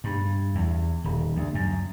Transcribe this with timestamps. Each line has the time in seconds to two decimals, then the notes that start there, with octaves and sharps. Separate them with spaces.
0.04 G2
0.55 E2
1.04 D#1
1.35 D2
1.55 F#2